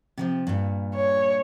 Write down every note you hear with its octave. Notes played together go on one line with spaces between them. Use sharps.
C3 E3 F3
G2 A#2
C#5